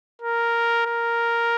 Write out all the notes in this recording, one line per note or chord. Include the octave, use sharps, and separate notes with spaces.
A#4
A#4